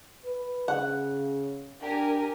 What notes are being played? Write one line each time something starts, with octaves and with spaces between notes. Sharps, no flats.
B4
C#3 F#5
D4 G4 A#4 G#5